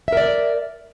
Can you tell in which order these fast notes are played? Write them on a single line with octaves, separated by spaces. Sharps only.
E5 A#4 D5